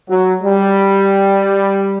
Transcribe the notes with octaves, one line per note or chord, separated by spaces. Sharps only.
F#3
G3